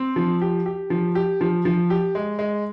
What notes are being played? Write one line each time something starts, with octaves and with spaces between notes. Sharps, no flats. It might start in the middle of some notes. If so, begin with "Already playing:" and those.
Already playing: C4
F3
G4
G4
F3
G4
F3
F3
G4
G#3
G#3